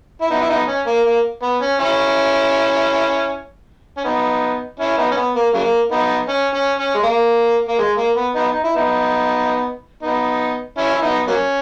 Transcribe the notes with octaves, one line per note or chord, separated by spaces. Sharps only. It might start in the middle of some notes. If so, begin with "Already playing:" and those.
E4
B3 D#4
E4
B3 D#4
C#4
A#3
A#3
B3
C#4
C#4 E4
C#4
B3 D#4
C#4 E4
B3 D#4
C#4
B3
A#3
C#3 F#3 A#3
B3 D#4
C#4
C#4
C#4
G#3
A#3
A#3
G#3
A#3
B3
B3 D#4
D#4
E4
B3 D#4
B3 D#4
C#4 E4
E4
B3 D#4
F#3 A#3 C#4